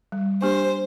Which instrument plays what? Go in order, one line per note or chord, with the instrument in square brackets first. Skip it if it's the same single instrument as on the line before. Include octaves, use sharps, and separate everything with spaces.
[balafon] G3
[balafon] A#3 D4 G4 [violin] C5